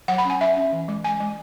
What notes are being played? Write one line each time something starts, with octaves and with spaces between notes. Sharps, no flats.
F#3 F#5
B5
C#4 G#5
C#4 E5
C#4
E3
G#3
G#3 G#5
G#3